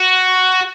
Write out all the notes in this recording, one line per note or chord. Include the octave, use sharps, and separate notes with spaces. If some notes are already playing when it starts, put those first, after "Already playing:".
Already playing: F#4